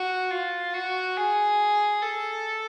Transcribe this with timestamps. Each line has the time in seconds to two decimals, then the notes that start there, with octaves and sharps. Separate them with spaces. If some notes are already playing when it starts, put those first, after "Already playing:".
Already playing: F#4
0.31 F4
0.73 F#4
1.17 G#4
2.02 A4